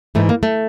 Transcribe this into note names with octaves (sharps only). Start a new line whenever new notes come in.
G#2 E3 A3
A#3
A3